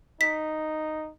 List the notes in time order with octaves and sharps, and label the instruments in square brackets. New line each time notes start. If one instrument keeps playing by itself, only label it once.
[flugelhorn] D#4 [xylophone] B6